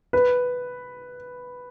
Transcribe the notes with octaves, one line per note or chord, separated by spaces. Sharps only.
B4